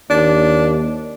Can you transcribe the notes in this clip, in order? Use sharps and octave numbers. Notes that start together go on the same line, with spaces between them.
D#2 D4